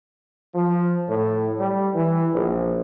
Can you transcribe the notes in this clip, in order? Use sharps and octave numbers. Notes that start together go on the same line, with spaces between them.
F3
A2
G3
E3
A#1